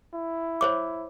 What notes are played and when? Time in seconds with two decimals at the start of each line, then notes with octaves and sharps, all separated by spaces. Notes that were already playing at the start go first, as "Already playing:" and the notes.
0.14 E4
0.61 C5 C#5 D6